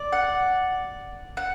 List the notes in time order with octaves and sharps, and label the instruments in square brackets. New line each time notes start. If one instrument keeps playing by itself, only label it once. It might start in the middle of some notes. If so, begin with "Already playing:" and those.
Already playing: [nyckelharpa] D5
[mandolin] F#5
F#5